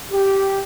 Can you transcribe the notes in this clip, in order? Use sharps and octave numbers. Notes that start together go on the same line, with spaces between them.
G4